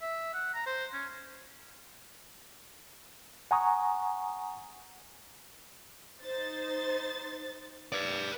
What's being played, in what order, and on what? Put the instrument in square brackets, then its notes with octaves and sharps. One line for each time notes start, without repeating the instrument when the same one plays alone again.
[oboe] E5
F#5
A#5
C5
C#4
[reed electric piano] F#5 G#5 A#5 C#6 D#6
[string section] D#4 C5 A6
[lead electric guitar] B4 D5